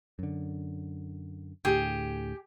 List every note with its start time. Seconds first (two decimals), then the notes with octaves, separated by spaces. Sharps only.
0.19 F#2 D3
1.65 D2 A2 D3 G4 G#4